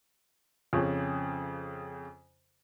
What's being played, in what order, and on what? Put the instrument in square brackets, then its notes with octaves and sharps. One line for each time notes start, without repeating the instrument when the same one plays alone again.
[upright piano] F2 C#3 C#4